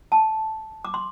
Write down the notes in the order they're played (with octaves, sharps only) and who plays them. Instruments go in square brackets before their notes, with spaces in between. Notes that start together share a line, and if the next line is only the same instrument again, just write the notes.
[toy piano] A5
D6
C6